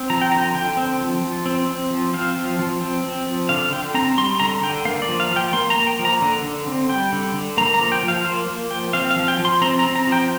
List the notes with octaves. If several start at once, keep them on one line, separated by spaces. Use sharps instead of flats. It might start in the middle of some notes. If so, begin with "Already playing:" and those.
Already playing: C4
F3 A#5
G5
D3 A#5
D3 G5
C4
F3
F3
C4
C4
F3
C4 F5
F3
F3
C4
C4
F3
D3 F5
D3 G5
C4 A#5
G3 C6
D3 A#5
D3 G5
A#3 F5
D5
F3
F5
F3
G5
A#3 C6
A#5
A#3
G5
F3
A#5
D3
D3
C4
G3 G5
D3
D3
A#3 A#5
A#5
F3
G5
F3
F5
A#3 C5
A#3
F3 G5
C4 F5
F5
F3
G5
F3
C6
C4 A#5
A#5
C4
A#5
F3
G5